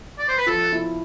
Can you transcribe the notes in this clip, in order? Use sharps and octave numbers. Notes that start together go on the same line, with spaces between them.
D5
C5
B4
F3 A4
E4